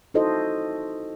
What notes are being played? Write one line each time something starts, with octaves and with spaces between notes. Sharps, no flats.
D#4 E4 F#4 A4 C5 D#5